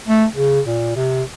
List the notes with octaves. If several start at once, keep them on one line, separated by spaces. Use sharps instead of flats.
A3
C#3
A#2
C3